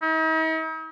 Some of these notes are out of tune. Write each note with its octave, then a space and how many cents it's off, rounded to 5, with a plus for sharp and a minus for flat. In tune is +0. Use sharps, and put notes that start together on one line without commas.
D#4 +45